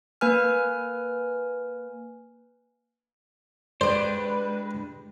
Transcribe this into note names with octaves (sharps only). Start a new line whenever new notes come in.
A#3 B4 G#5 F6
G#3 D4 G4 B4 C5 D5